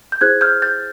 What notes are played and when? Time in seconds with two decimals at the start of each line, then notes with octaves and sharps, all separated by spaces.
0.12 G6
0.21 E4 G#4 C5 F#6 G#6
0.41 F6 G6
0.62 G6 A6